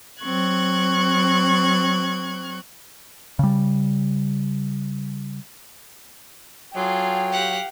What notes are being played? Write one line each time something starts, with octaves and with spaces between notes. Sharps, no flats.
F#3 C4 C#6 F#6 G#6
C#3 G3
F#3 F4 G#4 A4 G5
G4 F5 F#5